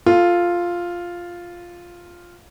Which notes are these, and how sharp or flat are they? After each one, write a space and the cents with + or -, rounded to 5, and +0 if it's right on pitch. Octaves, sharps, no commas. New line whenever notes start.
F4 +0 A4 +5